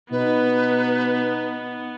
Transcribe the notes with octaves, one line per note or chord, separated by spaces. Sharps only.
B2 B3 D#4 B4